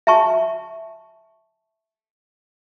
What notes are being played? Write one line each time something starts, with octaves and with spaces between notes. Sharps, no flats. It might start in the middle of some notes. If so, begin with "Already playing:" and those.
E5 G#5 A5 C#6